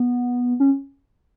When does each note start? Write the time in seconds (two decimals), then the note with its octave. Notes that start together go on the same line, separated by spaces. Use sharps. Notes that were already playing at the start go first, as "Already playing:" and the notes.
Already playing: B3
0.60 C#4